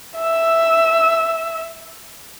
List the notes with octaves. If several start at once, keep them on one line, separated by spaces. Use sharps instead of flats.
E5 E6